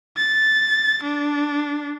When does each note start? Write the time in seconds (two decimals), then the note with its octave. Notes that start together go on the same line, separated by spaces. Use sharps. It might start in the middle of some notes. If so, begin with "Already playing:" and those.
0.18 A6
1.03 D4